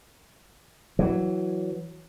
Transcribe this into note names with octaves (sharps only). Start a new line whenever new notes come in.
E3 F#3